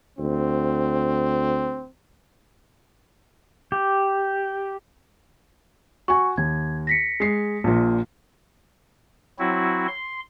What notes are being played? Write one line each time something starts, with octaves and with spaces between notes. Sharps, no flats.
D2 C4
G4
F#4 G#5 C#6
D#2 G#6
A#6 B6 C#7
G#3 C7
A#1 A#2
F#3 C4 E4 F#4
C6